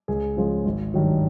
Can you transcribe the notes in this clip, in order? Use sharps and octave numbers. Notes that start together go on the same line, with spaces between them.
C#2 G#4
C#3 F3 G#3
G#1
G2 D#3 F#3